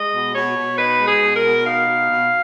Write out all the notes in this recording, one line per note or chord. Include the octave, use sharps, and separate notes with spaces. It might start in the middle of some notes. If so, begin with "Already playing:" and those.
Already playing: G#3 D#5
B2
B2 C#5
B2
D#4 B4
G#3
G#4
B2
A#4
B2
D#4 F5
B2
B2